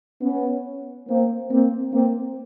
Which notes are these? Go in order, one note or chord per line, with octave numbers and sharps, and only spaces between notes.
B3 C#4
A#3 C4
A#3 C4
A#3 C4